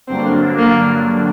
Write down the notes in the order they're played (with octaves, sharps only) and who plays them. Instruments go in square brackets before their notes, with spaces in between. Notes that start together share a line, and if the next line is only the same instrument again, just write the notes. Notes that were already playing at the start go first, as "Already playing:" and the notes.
[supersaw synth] G2 D3 F#3 A#3 D4 [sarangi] C4
[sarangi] A#3